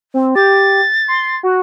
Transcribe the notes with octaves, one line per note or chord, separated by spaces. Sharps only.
C4
G4 A6
C6
F#4